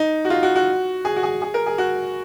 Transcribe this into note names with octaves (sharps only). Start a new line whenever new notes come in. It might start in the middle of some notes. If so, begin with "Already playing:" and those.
Already playing: D#4
F#4
F4
F#4
F#4
G#4
F#4
G#4
G#4
A#4
G#4
F#4